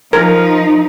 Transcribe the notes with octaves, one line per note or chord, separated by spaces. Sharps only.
F3 D#4 A#4